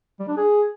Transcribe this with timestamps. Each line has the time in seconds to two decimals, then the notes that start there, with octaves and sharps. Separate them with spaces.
0.19 G3
0.28 D4
0.37 G#4